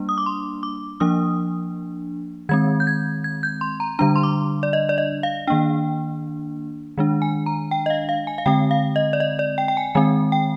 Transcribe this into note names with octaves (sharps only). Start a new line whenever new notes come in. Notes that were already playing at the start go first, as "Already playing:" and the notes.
Already playing: G3 A#3 D4
D#6
D6
C6
D6
F3 A#3 D4 D#6
D#3 G#3 C4 G#6
G6
G#6
G#6
G6
C6
A#5
D3 G3 D4 A#5
C6
D6
D5
D#5
D5
D#5
F5
D#3 A#3 D4 G5
D#3 G#3 D4
G#5
A#5
G5
D#5
F5
F5
G#5
F5
D3 G#3 C4 G5
F5
D#5
D5
D#5
D5
G5
G5
G#5
D#3 G#3 C4 G#5
G5